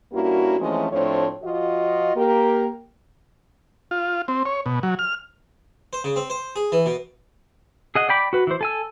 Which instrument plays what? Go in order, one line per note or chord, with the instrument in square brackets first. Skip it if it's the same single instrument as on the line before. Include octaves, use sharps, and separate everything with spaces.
[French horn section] G2 A#3 C#4 E4 F#4
E3 F3 G#3 A3 C4 C#4
A2 F3 A3 C4 D4 C#5
F3 F4 F#4 D#5
A#3 G4 A#4
[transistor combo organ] F4
C4
C#5
B2
F#3
F6
[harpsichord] C5
C#3
C4
C5
G#4
E3
B2
[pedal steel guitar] G#4 D#5 F#5
D5 G5 B5 D6
F#4 B4
E3 C5
A4 G#5 E6